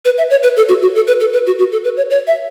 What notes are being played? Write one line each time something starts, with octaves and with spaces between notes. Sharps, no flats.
B4
E5
C#5
B4
A4
F#4
F#4
A4
B4
A4
B4
F#4
F#4
A4
B4
C#5
C#5
E5